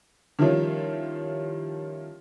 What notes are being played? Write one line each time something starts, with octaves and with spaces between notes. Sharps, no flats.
D#3 F3 G3 C#4 E4 F4